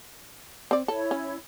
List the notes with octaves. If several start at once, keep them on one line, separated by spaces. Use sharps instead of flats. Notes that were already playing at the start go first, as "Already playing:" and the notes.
C4 D5
E4 A4 C#5
C#4